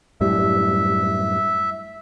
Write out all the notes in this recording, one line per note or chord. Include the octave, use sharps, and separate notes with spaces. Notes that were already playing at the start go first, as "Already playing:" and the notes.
F#2 A2 G3 E5